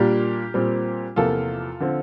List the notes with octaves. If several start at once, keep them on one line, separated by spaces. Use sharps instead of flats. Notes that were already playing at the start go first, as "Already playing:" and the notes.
Already playing: A#2 G3 A#3 D4 G4 A#4
A#2 G3 C4
E2 C3 F3 A#3 F4 A4
D3 F3 C4